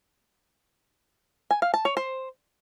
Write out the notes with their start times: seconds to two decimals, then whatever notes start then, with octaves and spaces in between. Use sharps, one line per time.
1.51 G#5
1.62 F5
1.74 A5
1.85 C#5
1.97 C5